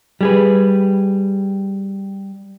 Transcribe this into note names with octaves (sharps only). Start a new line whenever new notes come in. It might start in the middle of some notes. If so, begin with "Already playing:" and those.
G3 G#4 B4